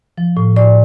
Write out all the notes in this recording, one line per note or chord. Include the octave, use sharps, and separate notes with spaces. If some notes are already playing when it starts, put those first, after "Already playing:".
F3
A2
A2 D5